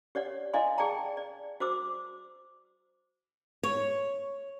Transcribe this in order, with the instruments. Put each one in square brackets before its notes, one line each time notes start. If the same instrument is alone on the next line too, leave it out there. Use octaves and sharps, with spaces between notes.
[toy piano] G4 C#5 D5 F#5
E4 D5 D#5 F5 G#5 C6
G#4 D5 G5 A5 A#5
D5
F#4 C5 D6 E6
[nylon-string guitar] C#5